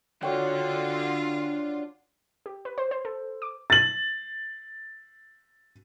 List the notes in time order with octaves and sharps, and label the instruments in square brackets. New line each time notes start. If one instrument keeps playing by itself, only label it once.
[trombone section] D3 [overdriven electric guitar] D4 F#5 [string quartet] F4 [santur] F#4 C#5 G5
[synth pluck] G4
B4
C5
C5
A4
D6
[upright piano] A6 F#7